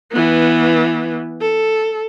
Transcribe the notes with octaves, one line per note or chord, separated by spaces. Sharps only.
E3 B3
A4